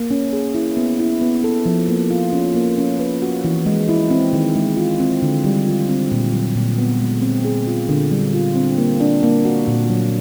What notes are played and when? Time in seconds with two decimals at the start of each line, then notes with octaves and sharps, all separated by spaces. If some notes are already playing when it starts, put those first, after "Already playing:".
Already playing: A#3
0.11 C#4
0.33 G#4
0.55 E4
0.77 B3
0.99 E4
1.21 B3
1.44 A4
1.66 F3
1.88 A#3
2.11 F4
2.33 C#4
2.55 A#3
2.78 C#4
2.99 B4
3.22 F#4
3.44 E3
3.66 G#3
3.89 E4
4.11 C4
4.33 D#3
4.56 G#3
4.77 F4
5.00 C4
5.22 D3
5.44 G3
5.66 F4
5.89 C4
6.12 A#2
6.33 F#3
6.56 A#2
6.78 B3
7.00 G#3
7.22 C4
7.45 G#4
7.67 F4
7.89 D3
8.11 G3
8.34 F4
8.56 C4
8.78 A#3
9.00 D4
9.23 A#3
9.45 F#4
9.67 A#2
9.90 F#3